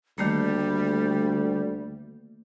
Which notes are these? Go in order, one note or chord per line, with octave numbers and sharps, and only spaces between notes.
D2 D#3 G3 A3 A#3